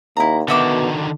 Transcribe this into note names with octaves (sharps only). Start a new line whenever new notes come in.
D#2 E4 A#5
B2 D3 D#3 F#4 E5 D6